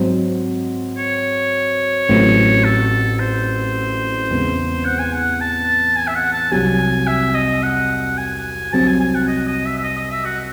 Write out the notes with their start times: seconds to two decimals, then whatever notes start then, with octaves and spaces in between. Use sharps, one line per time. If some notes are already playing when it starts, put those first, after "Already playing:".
Already playing: G#2 F#3 C4
0.98 C#5
2.09 A1 A2 F#3 A3 C4
2.64 A4
3.19 C5
4.30 E2 C#3 G#3 C4
4.85 F#5
4.99 G#5
5.13 F#5
5.41 A5
5.96 G#5
6.07 E5
6.15 F#5
6.33 A5
6.51 C2 C3 F#3 G#5
7.07 E5
7.34 D#5
7.63 F#5
8.18 G#5
8.73 C2 C3 F#3 C4 A5
8.87 G#5
9.00 G#5
9.15 F#5
9.28 D#5
9.47 D#5
9.65 E5
9.76 E5
9.84 D#5
9.97 D#5
10.11 E5
10.25 F#4